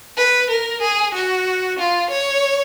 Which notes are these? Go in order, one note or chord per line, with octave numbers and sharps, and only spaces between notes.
B4
A#4
G#4
F#4
F4
C#5